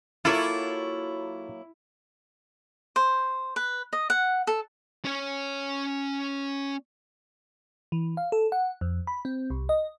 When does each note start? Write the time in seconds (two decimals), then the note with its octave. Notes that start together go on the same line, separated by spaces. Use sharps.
0.25 F#3 A#3 E4 F4 A4 C#5
2.96 C5
3.56 B4
3.93 D#5
4.10 F#5
4.47 A4
5.05 C#4 C#5
7.92 E3
8.17 F5
8.32 A4
8.52 F#5
8.81 F2
9.07 B5
9.25 C4
9.50 C2
9.69 D#5